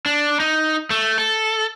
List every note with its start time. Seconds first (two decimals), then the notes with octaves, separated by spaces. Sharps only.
0.06 D4
0.40 D#4
0.90 A3
1.18 A4